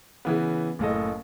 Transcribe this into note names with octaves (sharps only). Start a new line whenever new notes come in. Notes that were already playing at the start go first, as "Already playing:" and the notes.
C#3 E3 B3
F#1 A2 A4 D#5